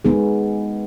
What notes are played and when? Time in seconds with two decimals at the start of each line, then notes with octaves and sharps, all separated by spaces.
0.05 G#3 B3 D#4 G#4